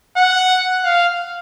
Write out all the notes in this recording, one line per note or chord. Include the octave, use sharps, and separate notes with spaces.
F#5
F5